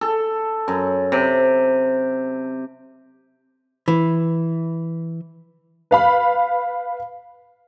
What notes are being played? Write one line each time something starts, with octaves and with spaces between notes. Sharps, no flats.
A4
F#2
C3
E3
B4 F5 B5